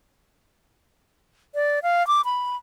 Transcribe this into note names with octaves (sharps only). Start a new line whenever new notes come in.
D5
F5
D6
B5